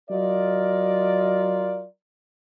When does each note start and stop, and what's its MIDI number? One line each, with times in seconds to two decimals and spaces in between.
0.10 1.86 54
0.10 1.86 65
0.10 1.86 70
0.10 1.86 74
0.10 1.86 75